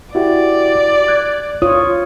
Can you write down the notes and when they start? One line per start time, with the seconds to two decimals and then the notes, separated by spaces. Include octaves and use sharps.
0.15 E4 F#4 G4 D5
1.08 F#6 G#6
1.62 F4 C#5 D#6